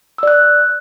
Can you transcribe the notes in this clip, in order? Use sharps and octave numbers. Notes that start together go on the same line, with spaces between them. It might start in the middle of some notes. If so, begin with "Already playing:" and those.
D5 E6 F#6